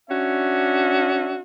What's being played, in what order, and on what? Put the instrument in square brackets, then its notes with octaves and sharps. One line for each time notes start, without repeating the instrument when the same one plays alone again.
[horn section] C#4 D4 F#4 E5